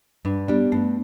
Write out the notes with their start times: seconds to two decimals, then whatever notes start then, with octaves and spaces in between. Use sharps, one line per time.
0.25 G2 D4
0.48 G3 B3 D4
0.72 G2 A3